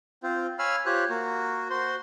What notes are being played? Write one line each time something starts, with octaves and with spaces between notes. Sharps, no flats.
C4 F4 C5
C#5 F5 G#5 B5 E6 F6
F4 G4 C5 C#5 F#6
A#3 F#4
F#4 C5 C6